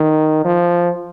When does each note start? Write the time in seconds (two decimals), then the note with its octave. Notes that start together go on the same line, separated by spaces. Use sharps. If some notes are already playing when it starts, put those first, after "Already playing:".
Already playing: D#3
0.45 F3